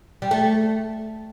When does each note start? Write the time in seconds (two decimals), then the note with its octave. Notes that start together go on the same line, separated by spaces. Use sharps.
0.22 G3
0.31 A3